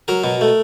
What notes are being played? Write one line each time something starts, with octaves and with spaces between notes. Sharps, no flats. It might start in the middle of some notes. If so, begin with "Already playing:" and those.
F#3 A#4
B2
A3